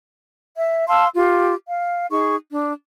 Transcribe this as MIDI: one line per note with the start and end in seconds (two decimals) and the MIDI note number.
0.57 0.88 76
0.89 1.06 77
0.89 1.06 81
0.89 1.06 84
0.89 1.06 88
1.14 1.54 65
1.14 1.54 67
1.68 2.07 77
2.10 2.36 63
2.10 2.36 68
2.10 2.36 85
2.52 2.73 62